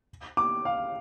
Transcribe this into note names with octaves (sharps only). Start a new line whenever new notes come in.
D6
F5